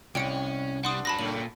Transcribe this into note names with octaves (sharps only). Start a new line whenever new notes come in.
C2 G#2 G3 C#4 G5 C#7 D7
G3 B3 D4 F#5 C6 D#6
G2 F#3 A5 B5 A#6
F#2 A#2 C#3 A3 F#7